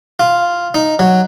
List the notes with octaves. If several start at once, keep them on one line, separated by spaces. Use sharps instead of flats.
F4
D#4
F#3